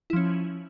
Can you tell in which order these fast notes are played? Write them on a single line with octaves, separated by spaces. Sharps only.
E4 F3 C#4